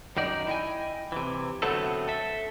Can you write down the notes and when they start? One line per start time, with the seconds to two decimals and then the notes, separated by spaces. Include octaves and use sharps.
0.17 F#2 D#3 D#4 D5
0.47 E4 D#5 G5 G#5
1.12 C3 E3
1.62 D3 F#3 A3 B3 C4 A4
2.08 A4 E5